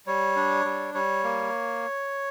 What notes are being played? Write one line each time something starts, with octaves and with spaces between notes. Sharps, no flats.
G3 C#5
D4
G3
G3 C#5
A#3